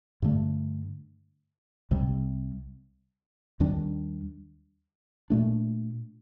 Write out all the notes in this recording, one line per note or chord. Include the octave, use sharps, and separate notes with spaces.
G2 D3 A3
C2 C3 G3
D#2 D#3 G3 D4
A#2 A3 D4